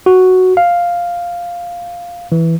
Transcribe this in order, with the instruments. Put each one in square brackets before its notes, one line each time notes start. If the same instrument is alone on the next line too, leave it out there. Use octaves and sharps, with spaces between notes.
[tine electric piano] F#4
F5
E3